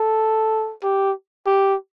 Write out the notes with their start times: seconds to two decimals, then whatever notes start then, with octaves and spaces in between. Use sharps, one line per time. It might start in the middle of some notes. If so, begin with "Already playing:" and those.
Already playing: A4
0.83 G4
1.47 G4